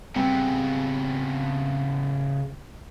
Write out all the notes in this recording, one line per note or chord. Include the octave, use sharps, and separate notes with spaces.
C#3 G3 B3 C4 G#5